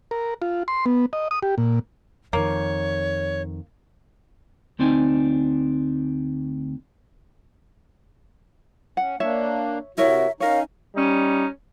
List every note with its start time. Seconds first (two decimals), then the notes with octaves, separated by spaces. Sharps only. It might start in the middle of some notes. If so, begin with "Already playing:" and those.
0.11 A#4
0.42 F4
0.68 C6
0.86 B3
1.13 D#5
1.31 D#6
1.43 G4
1.58 A#2
2.33 F2 D#3 A#3 C#5
4.79 D2 C4 D4 D#4 G#5
8.97 C#4 F#5
9.20 A#3 D4 C#5 E5
9.98 C3 E4 F#4 A#4 C#5 E5
10.40 C#4 D#4 A#4 C#5 F5
10.95 G3 C#4 D#4